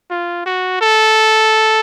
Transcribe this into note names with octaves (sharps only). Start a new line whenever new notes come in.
F4
F#4
A4